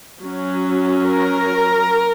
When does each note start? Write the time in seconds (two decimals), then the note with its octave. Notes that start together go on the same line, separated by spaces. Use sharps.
0.21 F#3 C#4
1.06 A#4